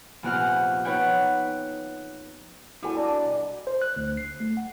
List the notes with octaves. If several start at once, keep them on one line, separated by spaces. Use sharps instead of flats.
F1 A#1 B3 C4 F#5 F6
B3 D#4 B4 C#5 F#5 G5
E2 G3 E4 F#4 A4 G#5
D4 D5 A#5
B2
C5
F#6
D2
C7
A3
F#5